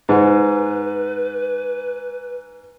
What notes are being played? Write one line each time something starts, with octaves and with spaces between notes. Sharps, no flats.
G#2 B4